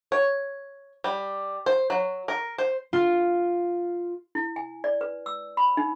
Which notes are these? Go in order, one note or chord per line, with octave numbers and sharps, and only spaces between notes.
C#5
G3
C5
F#3
A#4
C5
F4
E4
G#5
D5
B4
E6
B5
D#4